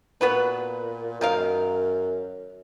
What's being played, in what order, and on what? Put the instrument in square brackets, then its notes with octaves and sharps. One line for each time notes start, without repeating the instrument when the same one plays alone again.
[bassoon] A#2 [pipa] B3 F#4 B4
[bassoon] F#2 [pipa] D#3 A#4 F5